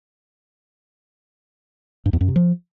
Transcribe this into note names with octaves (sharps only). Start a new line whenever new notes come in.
G2
E2
F#2
C3
F3